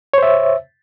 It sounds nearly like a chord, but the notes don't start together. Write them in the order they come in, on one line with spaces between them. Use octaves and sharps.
C#5 C5 E5